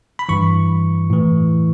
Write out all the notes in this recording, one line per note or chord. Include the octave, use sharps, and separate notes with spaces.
B5
G2 E3 C#6
A2 E3